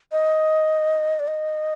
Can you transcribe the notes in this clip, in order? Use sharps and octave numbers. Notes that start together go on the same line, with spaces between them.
D#5
D5
D#5